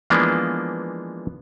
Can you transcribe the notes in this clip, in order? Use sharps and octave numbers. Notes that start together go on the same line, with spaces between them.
E3 F3 G#3 A#3 B3 D4